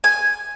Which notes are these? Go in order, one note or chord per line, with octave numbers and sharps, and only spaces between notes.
G#5